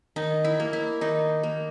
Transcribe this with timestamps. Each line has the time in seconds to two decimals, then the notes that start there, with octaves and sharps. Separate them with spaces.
0.16 D#3 D#4
0.45 E4
0.60 A#3
0.73 E4
1.01 D#3 D#4
1.43 A#3